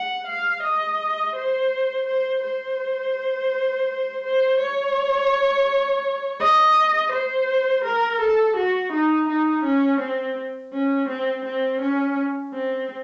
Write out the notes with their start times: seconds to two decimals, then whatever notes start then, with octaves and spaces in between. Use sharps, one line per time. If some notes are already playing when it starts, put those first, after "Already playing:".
Already playing: F#5
0.27 F5
0.63 D#5
1.35 C5
2.07 C5
2.43 C5
4.24 C5
4.60 C#5
6.40 D#5
7.12 C5
7.85 A#4
8.21 A4
8.56 F#4
8.92 D#4
9.29 D#4
9.65 C#4
10.00 C4
10.73 C#4
11.09 C4
11.45 C4
11.81 C#4
12.54 C4